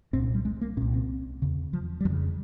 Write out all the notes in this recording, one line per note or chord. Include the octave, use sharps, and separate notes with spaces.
C2 A#2 C4
C#4
G3
G#3
A#3
C2 A#2 C#4
C4
E2 C#3
F3
G3
F2 C#3 F3